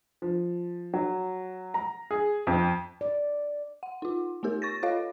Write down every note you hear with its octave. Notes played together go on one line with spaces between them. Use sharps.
F3
F#3
A#5
G#4
F2
D5
F#5
D#4 F4
A3 B3 D#4 G4 A#4
C#6 A6 A#6
F4 A4 C#5 D#5 F5